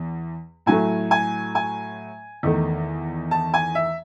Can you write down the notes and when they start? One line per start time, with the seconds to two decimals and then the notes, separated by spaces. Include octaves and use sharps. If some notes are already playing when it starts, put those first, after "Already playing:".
Already playing: E2
0.66 A2 F#3 A3 G#5
1.11 G#5
1.55 G#5
2.43 E2 D#3 A3
3.31 A5
3.54 G#5
3.75 E5